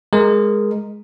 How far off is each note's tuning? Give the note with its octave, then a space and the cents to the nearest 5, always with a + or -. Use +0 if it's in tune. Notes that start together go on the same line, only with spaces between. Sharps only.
G#3 +0 A#4 +0